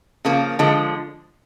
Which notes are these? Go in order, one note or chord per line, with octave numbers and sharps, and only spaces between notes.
C#3 F3 A#3
D3 F3 G#3